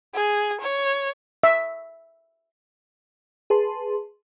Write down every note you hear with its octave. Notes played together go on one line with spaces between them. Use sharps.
G#4
C#5
E5
G#4 B4 A5 C6